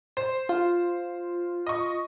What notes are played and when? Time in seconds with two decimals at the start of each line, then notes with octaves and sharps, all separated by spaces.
0.17 C5
0.49 F4
1.67 D#5 C#6